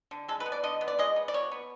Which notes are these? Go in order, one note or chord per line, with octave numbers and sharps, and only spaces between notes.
D3
G#3 A4
B4
B3
D5
D3 D#5
B3
D5
G#3 D#5
B3
D5
B2 C#5
B3